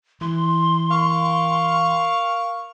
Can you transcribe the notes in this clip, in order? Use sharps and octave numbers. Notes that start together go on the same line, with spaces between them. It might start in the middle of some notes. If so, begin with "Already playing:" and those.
E3 C6
A#4 F5 C#6